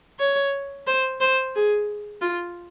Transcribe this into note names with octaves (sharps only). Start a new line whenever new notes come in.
C#5
C5
C5
G#4
F4